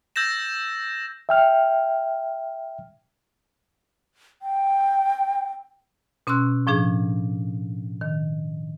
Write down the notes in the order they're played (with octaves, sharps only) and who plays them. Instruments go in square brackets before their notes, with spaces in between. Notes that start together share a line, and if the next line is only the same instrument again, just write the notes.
[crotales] E6 G6 A6 A#6 E7
[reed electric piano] E5 G5 F6
[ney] G5
[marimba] B2 C#4 C6 E6 F#6
A2 F3 D4 G#4
D#3